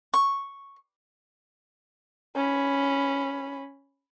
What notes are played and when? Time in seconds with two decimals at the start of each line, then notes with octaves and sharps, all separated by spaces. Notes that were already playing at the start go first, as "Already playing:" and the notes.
0.14 C#6
2.36 C#4 B5